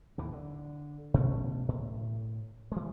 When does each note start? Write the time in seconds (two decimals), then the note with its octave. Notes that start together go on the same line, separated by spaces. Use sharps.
0.18 D#2 A2 E3
0.32 D3
1.14 B2 A3 C#4
1.68 A2
2.72 E3 G3 G#3